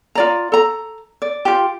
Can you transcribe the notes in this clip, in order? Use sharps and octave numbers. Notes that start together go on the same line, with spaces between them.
F4 D5 A#5
A4 A#5
D5
F4 G4